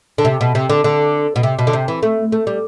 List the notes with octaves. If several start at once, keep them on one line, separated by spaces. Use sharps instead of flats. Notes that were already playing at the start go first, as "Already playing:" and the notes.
D3
C3
B2
C3
D3
D3
B2
C3
B2
D3
C3
E3
A3
A3
G3